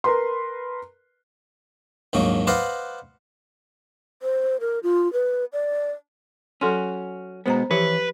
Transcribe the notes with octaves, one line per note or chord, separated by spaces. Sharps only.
A#4 B4 C6
A#1 D#2 G#2 F#3 A#3
B4 C5 D5 D#5 F5 F#5
C5
A#4
F4
B4
D5
F#3 C#4 F#4 A4 C6
B2 G#3 B3 C5 A#5
E3 F3 E4 G4 B4 C#5